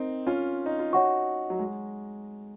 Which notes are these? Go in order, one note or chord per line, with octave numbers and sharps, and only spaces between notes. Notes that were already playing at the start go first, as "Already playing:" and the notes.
Already playing: C4 D#4 A#4
C#4 F4
D#4
F4
D#4 F#4 C#5 F#5 C#6
F#3
G#3